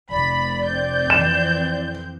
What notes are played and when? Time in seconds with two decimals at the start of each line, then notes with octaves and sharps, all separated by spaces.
0.11 F1 D5 B5
0.65 C4 G6
1.10 F2 E3 E7